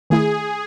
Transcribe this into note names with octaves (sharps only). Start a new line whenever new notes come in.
D#3 A3 E4 G#4